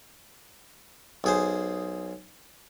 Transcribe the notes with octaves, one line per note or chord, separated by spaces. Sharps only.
B1 G#4 C5